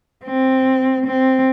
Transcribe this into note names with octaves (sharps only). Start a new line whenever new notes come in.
C4
C4